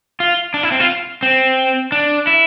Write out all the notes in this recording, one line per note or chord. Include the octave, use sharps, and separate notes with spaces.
F4
D4
E4
C4
F4
C4
D4
E4